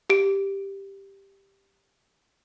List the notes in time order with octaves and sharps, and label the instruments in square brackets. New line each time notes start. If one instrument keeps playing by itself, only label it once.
[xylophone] G4 D7